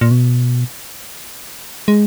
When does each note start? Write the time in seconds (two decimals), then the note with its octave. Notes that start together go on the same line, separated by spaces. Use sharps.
0.01 A#2
0.11 B2
1.88 G#3